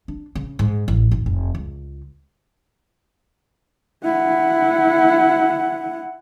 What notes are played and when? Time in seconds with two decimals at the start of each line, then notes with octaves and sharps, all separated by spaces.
0.08 D4
0.35 C#3
0.59 G#2
0.88 A1
1.11 G#1
1.26 F1
1.55 C#2
4.05 E4 F#5